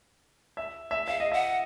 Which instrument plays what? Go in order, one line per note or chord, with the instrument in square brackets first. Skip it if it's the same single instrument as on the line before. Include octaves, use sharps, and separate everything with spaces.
[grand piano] E5
E5
[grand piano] E5 [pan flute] F5
[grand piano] D#5
[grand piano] E5 [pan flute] F#5